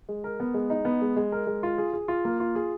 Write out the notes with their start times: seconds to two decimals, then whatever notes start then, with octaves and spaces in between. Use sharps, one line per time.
0.09 G#3
0.24 A#4
0.40 B3
0.54 G#3
0.70 D#4
0.85 B3
1.02 G#3
1.16 G#3
1.32 A#4
1.47 G#3
1.63 F4
1.78 G#4
1.93 G#4
2.08 F4
2.25 A#3
2.40 F4
2.55 G#4